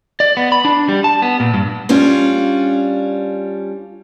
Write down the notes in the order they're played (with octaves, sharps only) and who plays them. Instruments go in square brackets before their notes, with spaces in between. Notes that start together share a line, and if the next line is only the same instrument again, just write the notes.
[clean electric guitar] D5
B3
B5
D4
G3
A5
B3
A#2
G2
[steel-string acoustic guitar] G3 C#4 D4 F4